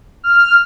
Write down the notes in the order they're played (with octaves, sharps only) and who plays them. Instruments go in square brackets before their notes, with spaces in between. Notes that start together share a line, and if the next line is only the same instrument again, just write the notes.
[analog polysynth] F6